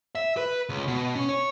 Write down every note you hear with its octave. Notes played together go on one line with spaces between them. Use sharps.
E5
B4
C#2
B2
C#4
C#5